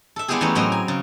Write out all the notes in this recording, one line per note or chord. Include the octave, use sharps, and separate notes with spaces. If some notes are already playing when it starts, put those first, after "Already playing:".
A4 E5
G3 G#3 B3 E4 G4 G#4
E3 A3 B3 C#4 D#4
A2 F#3 C4 D#5 A#5
G#5
C#3